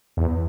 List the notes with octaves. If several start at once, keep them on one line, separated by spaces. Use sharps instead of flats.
E2